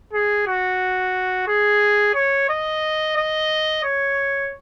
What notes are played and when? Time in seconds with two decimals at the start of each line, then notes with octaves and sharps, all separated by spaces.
0.13 G#4
0.47 F#4
1.48 G#4
2.15 C#5
2.50 D#5
3.17 D#5
3.84 C#5